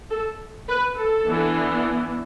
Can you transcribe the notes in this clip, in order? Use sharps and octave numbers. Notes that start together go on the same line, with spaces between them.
A4
B4
A4
E3 B3 D4